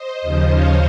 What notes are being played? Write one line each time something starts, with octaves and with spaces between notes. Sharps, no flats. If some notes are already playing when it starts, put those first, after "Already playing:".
Already playing: C5 D#5
D#2 C#3 F3
C#5 F5